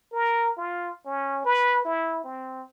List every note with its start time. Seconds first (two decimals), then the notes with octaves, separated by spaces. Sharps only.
0.12 A#4
0.57 F4
1.06 C#4
1.45 B4
1.85 E4
2.24 C4